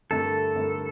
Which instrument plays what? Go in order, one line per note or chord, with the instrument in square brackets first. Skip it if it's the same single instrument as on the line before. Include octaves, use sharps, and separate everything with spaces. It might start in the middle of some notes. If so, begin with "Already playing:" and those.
[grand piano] G2 D3 A3 E4 A#4 [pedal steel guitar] A4
[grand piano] G2 D3 A3 E4 A#4